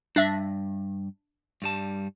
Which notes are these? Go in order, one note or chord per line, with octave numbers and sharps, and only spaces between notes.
G2 D4 E5 A#6
G2 G3 A5